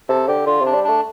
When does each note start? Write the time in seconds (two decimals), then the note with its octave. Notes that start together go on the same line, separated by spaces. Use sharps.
0.09 C3 A4
0.28 D3 G4
0.46 D3 F4
0.60 C3
0.66 D4
0.74 G3
0.84 A3 D4